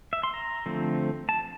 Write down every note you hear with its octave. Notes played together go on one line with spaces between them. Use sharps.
E5
C6
A#5
D3 F3 A3 C4
A5